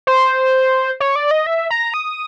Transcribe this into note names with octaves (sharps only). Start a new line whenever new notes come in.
C5
C#5
D5
D#5
E5
A#5
D#6